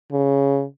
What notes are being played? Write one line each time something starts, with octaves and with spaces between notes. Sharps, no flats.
C#3